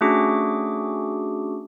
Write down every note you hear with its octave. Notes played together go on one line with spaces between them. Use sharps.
A3 C#4 D4 F#4 G#4 D6